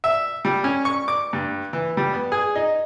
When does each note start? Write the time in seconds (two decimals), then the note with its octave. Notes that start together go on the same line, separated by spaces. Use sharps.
0.04 E5
0.45 G3
0.64 C#4
0.85 C#6
1.08 D6
1.33 G2
1.73 E3
1.97 G3
2.13 B3
2.32 G#4
2.56 D#4